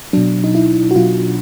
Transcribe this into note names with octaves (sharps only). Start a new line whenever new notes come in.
B2 F#3 D4
D#4
E4
F#4
B2 F#3 F4